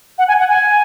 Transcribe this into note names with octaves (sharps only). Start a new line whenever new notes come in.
F#5
G#5
F#5
G#5